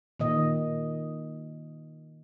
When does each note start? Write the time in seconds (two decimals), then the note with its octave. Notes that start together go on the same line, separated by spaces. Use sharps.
0.20 A#2 D#3 D#5